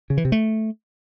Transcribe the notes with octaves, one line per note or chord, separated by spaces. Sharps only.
C#3
E3
C3
A3